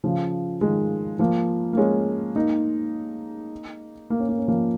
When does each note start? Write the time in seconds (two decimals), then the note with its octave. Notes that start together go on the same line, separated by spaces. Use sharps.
0.04 C#3 F3
0.61 D#3 G#3
1.19 F3 A#3
1.73 A#3
1.77 G#3 C#4
2.36 A#3 D#4
4.10 A#3
4.20 C#4
4.29 A#3
4.38 C#4
4.48 F3 A#3